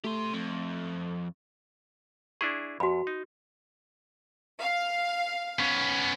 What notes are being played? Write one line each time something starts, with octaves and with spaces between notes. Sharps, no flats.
A3 G4 C6
F2
D4 E4 G#4 C#6
F2 F#4 B5
D#4
F5
B3 C#4